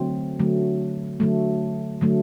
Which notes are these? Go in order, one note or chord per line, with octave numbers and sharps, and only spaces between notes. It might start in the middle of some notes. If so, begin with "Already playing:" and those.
Already playing: D3 F#3 A3 C4
D3 F#3 A3
D3 F#3 A3
D3 F#3 A3